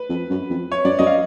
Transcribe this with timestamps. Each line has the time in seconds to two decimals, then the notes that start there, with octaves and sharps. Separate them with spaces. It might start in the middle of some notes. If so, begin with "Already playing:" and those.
Already playing: B4
0.09 F2
0.30 F#2
0.50 F2
0.72 C#5
0.85 F#2 D5
0.99 F#2 D#5
1.07 F5